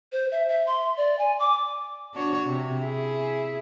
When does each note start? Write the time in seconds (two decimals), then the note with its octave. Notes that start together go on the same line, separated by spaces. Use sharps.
0.12 C5
0.32 E5
0.49 E5
0.67 C6
0.97 D5
1.19 G#5
1.40 D6
2.14 D4 F#4 C#5
2.45 C3
2.80 E4 G#4